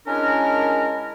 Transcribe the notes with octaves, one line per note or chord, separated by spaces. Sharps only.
G#3 C#4 D4 E4 A#4